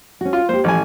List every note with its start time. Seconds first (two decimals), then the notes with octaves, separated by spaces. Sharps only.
0.21 C#4 F#4
0.33 F4
0.49 A#3 G4 C5
0.64 A1 E3 F3 G3 G#5